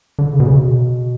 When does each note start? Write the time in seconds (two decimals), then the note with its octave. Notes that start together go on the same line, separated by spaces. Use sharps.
0.19 D3
0.33 C#3
0.40 B2
0.46 C#3
0.58 B2